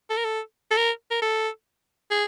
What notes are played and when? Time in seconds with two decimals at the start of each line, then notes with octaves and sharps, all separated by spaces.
0.10 A4
0.17 A#4
0.25 A4
0.71 A4
0.77 A#4
1.11 A#4
1.22 A4
2.11 G#4